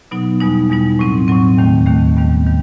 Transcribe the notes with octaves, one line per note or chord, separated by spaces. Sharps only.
B2 F#3 B3 D#4
E2 B2 G3 D#4
E2 B2 G3 D#4
A2 F#3 C4
A2 F#3 C4
D#2 D#3 A3
D#2 D#3 A3
D#2 D#3 G3 B3
D#3 G3